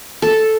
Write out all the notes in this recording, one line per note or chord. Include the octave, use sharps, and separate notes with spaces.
A4